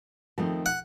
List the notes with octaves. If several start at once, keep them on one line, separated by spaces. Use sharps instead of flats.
F2 D#3 A3 C4
F#5